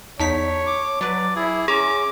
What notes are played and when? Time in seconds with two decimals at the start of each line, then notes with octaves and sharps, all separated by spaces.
0.20 E2 D#4 C#5 A5 B6
0.67 D6
1.01 F#3 B4 D5
1.36 E4 G#4
1.68 C#4 G#4 A#5 D6